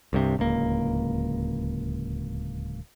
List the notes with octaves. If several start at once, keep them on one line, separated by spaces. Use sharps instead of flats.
C2 G2 C3
D1 C#2 A#3